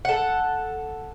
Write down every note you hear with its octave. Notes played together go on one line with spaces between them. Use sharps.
A4 F#5